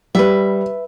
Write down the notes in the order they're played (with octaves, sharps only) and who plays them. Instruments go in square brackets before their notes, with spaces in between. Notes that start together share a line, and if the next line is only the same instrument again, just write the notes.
[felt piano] G3 [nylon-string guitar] B4 E5